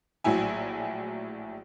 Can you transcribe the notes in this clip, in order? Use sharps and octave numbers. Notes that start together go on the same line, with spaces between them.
A#1 A2 F#3 E4 G#5